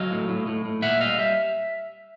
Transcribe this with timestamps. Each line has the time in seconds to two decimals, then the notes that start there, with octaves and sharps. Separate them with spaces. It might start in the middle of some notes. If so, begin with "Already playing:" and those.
Already playing: F#3 D#5 F5
0.11 A2
0.29 A2
0.47 A2
0.65 A2
0.82 A#2 E5 F#5
1.01 G3 D#5 F5
1.18 G3 E5